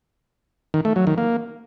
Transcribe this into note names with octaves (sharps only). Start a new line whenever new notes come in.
D#3
A3
F#3
D#3
A#3